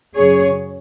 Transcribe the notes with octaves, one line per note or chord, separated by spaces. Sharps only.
F#2 C#3 G#4 C#5